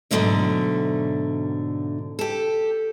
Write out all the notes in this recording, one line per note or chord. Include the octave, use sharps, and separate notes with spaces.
G#2 B2 D3 F#3 A3 D4
G4 A4